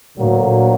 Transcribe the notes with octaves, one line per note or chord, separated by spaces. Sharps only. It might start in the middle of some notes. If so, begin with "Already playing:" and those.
D2 A2 D3 F#3 A#3
A#2